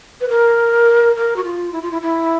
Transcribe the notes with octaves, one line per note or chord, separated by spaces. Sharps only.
B4
A#4
A#4
F#4
F4
E4
F4
E4
E4